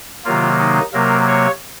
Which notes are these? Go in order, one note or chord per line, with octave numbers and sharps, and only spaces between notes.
C3 D#3 F#3 A#3 F4
D#4
C3 F#3 A#3 A#4
C#5